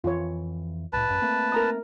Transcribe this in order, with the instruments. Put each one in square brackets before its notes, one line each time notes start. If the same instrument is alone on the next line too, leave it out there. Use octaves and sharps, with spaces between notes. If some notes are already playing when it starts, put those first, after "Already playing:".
[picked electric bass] F2 E3 [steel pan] F4 C#5
[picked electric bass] C2 A2 [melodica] B4 A5
[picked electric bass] A1 F#2
A3 A#3 C4
[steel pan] A#4 A#5 D#6